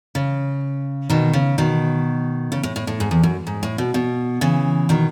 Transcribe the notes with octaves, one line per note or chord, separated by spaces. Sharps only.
C#3
B2 D#3
C#3
B2 D#3
C#3
A2
A2
A2
G#2
E2
F#2
G#2
A2
B2
B2
C#3 E3
B2 D#3